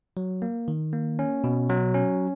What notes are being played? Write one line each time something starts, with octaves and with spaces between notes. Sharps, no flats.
F#3
A#3
D#3
A#3
C#4
B2
F#3
C#4